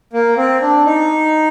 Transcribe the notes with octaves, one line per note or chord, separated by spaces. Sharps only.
A#3
C4
D4
D#4